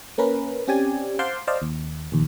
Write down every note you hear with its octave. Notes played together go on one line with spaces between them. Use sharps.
A#3 C#4 A#4 B4
C4 C#4 G4 D5 G#5
C5 F5 F#5 A5 C6 D6
C5 D5 D#5 F5 A5
D#2
A#1 D#2